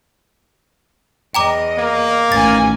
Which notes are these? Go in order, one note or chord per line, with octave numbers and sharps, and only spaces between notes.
E2 D#5 G5 A#5 D6
A#3
A1 D#2 C#4 G#5 A6